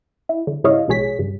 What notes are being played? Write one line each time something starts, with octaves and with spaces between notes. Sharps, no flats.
E4
D3
G#2 C#3 E4 C#5 D#5 F5
A#1 B2 G#3 G#4 C#5 B6
G2 C#3